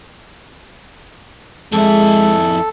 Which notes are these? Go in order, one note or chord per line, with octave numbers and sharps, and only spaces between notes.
F2 G#3 E4 A4